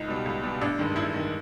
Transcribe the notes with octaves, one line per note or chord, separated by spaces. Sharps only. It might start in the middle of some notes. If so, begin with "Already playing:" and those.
Already playing: C#2 D#4
B2 G3
C#2
B2 G3
A1 D4
G2 D#3 G#3
A1 E4
G2 D#3 G#3